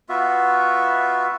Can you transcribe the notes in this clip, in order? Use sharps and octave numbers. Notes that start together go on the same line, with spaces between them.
B3 F4 F#4 E5